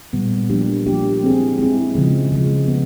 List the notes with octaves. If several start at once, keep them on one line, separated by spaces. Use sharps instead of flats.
A#2 G3 B3
F3 A#3 D4 G4
F3 A#3 D4 G4
G#3 C4 E4 G#4
G#3 C4 E4 G#4
C#3 F3 G#3
C#3 F3 G#3
B3